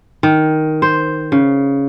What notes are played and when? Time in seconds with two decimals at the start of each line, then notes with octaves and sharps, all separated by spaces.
0.23 D#3
0.82 C5
1.32 C#3